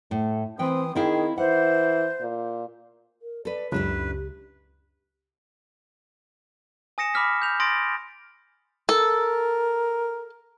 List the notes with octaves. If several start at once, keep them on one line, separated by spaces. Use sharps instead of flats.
A2 A3
E3 C4 B4 G5 D#6
D#3 C4 E4 G#4 F5
E3 C5 F#5
A#2
A#4
A4 B4 D5
C#2 F#2 D4 E4 G4 B4
G#5 D#6 A#6 C#7 E7
B5 D6 F6 B6
G6 F7
C6 D#6 A6 A#6 D7
A4 A#4